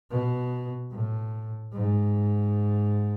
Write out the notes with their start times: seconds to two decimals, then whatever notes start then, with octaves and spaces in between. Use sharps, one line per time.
0.11 B2
0.91 A2
1.73 G#2